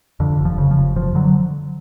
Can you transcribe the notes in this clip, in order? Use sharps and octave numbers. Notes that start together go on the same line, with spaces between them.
F2 D3
F1
F3
C#3
F3
F1
F#1 F3
D3 F#3